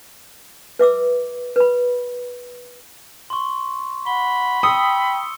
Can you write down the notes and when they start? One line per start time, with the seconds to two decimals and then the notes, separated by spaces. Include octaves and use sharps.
0.79 B4 E5 D6 E6
1.56 B4 B5
3.30 C6 C#6
4.07 F#5 B5 G7
4.63 G5 D#6 E6 C#7 G7